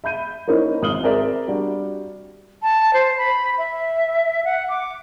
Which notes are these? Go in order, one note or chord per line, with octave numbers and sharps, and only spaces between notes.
E5 B5 G6 D#7
A#3 C#4 D#4 E4 A#4 C5
G#1 D#6 F6 F#7 G7
C4 G#4 A#4 D5 E5
G3 D4 F#4
A5
C5
B5
E5
F#5
D6